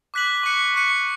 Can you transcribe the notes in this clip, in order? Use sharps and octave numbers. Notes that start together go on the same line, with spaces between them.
D6 F#6 B6 F#7
C#6 F#6 C#7
C#6 F#6 C#7